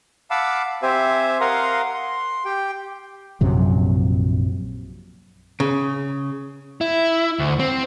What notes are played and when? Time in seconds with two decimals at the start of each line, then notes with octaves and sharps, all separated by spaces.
0.31 F5 F#5 A5 B5 D6 E6
0.83 C4 G4 C5 E5 G#5
1.41 A#4 F5 F#5 A#5 C6 D#6
1.94 C6
2.45 G4 G5
3.41 A#1 F#2 C3 F#3
5.60 C#3
6.81 E4
7.39 D2
7.59 C4